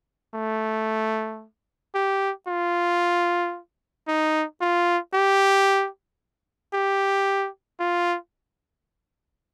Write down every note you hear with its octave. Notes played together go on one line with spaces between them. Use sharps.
A3
G4
F4
D#4
F4
G4
G4
F4